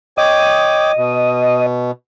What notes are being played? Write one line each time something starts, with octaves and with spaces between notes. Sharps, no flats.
C#5 D#5 G5 D6
B2